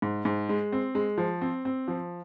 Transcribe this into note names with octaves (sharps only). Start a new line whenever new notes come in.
G#2
G#2
G#3
C4
G#3
F3
C4
C4
F3